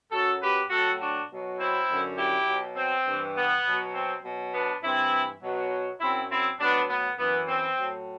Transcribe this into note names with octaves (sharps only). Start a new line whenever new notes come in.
F#2 F#3 F#4 A4
G4 B4
A2 F#3 F#4 A4
D4 F#4
B2 F#3
C4 E4
F#2 D3 F#3
E4 G4
B2 F#3
C4
G2 E3
B3
B2 F#3
C4
B2 F#3
B3 D4
G2 E3 C4 E4
B2 F#3
F#2 F#3 C4 E4
C4 E4
A2 F#3 B3 D4
B3
F#2 E3 B3
C4
A2 F#3